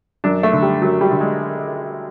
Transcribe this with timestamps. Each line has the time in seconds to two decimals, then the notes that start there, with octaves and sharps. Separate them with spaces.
0.24 F#2 D4
0.43 A3
0.53 D3
0.62 G3
0.82 F#2 F#3
1.01 G3
1.12 D3
1.21 G#3